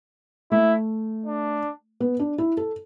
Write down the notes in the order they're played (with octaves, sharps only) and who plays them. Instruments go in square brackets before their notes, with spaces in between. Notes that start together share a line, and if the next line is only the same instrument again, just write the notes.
[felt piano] A3 [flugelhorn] E4
[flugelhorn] D4
[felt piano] B3
D4
E4
A4